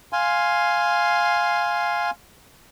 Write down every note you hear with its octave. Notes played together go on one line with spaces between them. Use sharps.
F5 G#5 C6